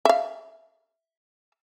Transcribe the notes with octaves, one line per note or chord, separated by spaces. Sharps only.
E5 F5